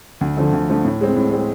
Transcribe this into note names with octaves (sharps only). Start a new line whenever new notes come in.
D2
D3 F3 A3
D2
D3 F3 A3
A2
G#3 C4
A2
G#3 C4